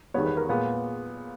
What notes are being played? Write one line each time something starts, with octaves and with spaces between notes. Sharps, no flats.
E2 D#3 G3 B3 C#5
B4
A#4
A#2 G#3 B3